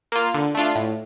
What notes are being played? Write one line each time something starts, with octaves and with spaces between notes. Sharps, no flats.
A#3 F4
D3
A3 D4 F4
A2